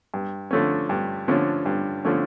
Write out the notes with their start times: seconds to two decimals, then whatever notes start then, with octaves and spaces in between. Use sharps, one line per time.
0.14 G2
0.51 D3 F3 A3 C#4
0.89 G2
1.28 D3 F3 A3 C#4
1.66 G2
2.05 D3 F3 A3 C#4